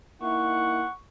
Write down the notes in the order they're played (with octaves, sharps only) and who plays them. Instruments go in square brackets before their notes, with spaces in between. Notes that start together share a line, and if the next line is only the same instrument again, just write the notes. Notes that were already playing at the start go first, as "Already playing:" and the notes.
[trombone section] A#3 D#4 E4 [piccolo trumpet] F#5 [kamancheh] C#6